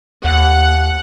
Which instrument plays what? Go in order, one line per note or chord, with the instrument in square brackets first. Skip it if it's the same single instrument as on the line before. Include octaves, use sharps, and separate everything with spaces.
[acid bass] D#2 [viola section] F#5